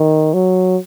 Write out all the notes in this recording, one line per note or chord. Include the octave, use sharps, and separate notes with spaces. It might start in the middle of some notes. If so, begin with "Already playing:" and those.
Already playing: D#3
F#3